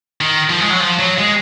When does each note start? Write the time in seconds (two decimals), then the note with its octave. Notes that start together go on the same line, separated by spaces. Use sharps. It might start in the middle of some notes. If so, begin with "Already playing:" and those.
0.21 D#3
0.50 F3
0.60 G#3
0.70 F#3
0.80 F3
0.99 F#3
1.18 G#3